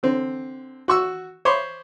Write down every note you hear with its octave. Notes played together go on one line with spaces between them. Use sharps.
D3 C4
F#4 C#6 E6
C5 C#5 B5 C6 D6